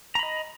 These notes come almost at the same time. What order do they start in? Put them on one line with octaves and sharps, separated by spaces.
A#5 B5 D#5